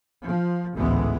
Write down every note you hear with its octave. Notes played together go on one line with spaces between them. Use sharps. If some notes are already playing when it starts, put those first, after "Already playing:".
F3
A1 D2 G#2 E3 G#3 B3